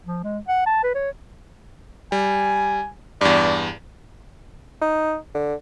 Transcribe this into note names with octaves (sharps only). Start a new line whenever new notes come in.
F3
G#3
F#5
A5
B4
C#5
G3 G#5
E2 G2 D5
D#4
D3